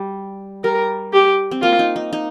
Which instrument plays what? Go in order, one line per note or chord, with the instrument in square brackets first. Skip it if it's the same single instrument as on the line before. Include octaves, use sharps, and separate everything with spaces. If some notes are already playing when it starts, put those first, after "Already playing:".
Already playing: [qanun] G3
[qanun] G3 [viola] A#4
[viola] G4
[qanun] C4
[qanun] A#3 [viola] F4
[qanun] D#4
D#4
D#4